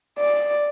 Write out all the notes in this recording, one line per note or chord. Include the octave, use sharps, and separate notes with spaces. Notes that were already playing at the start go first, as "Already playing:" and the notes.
D5